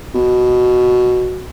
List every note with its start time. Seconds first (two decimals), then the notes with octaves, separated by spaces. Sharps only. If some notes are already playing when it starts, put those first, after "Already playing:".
0.15 B2